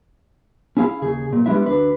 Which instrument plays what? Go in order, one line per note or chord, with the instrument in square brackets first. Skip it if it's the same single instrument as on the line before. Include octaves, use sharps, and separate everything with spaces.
[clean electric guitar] C#4 E4 G#4 F5
D#2 C#3 G#4
B1 A#2
G3 G#3 B3 D4 E4 E5
D2 D4 B4